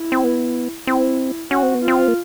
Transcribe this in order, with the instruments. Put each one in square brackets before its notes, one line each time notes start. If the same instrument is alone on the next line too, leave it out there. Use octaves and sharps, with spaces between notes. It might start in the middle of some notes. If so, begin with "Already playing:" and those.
Already playing: [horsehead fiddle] E4
[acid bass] C4
B3
[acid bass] C4 [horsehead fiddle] E4
[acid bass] C#4 [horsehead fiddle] F#4
[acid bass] C4
B3
[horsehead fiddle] F4
[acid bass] C4
A#3